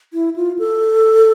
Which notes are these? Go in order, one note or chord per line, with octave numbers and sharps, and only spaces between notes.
E4
F4
A4